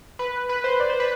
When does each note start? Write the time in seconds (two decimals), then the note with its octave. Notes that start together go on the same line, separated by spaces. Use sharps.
0.19 B4
0.49 B4
0.64 C5
0.80 D5
0.90 C5
1.00 B4